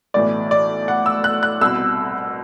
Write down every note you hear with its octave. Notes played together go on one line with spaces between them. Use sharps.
B1 A2 E3 D5
D5
F#5
E6
F#6
F#6
C2 B2 E6